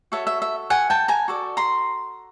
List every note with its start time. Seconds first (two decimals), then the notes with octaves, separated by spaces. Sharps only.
0.12 F#4 A4 C#5 E5
0.27 E5
0.42 E5
0.70 F#5 G#5
0.90 G5 A5
1.08 G#5 A#5
1.28 F#4 A4 D5
1.57 A#5 C6